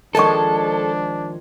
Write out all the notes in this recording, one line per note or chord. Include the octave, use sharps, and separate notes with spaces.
D#3 F3 G#3 D4 A4 A#4 D#5 C#6